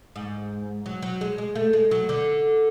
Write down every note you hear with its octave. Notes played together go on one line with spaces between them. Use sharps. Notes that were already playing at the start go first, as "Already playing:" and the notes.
G#2
F#3
F#3
G#3
G#3
A3
G#3
F#3
D3